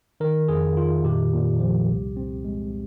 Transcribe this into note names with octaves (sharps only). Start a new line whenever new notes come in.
D#3 A#4
F2 G#4
D#3 F4
A#2 G4
A#2
F3
C2
C4
G#3